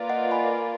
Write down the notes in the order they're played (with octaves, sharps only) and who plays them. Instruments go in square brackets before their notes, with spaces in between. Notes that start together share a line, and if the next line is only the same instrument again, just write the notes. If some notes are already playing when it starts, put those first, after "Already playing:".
Already playing: [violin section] A#3 F4 B4 D5
[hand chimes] D#5 F#5
G#5 B5